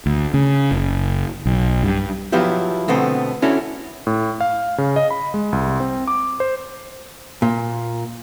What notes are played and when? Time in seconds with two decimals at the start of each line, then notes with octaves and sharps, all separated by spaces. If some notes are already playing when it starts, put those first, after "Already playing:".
0.06 D2
0.34 C#3
0.71 F#1
1.46 B1
1.83 G2
2.32 F3 F#3 B3 E4 G4
2.88 B2 D3 A3 B3 C4
3.42 C#4 D4 E4 F#4 A4
4.07 A2
4.41 F5
4.78 C#3
4.96 D#5
5.10 B5
5.34 G#3
5.52 C2
5.80 C4
6.07 D6
6.40 C5
7.42 A#2